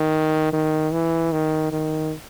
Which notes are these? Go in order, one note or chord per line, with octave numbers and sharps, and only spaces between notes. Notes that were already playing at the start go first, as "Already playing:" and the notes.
Already playing: D#3
D#3
E3
D#3
D#3